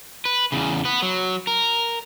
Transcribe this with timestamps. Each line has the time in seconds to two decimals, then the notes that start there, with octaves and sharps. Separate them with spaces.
0.25 B4
0.52 E2 C#3
0.85 B3 B4
1.02 F#3
1.47 A#4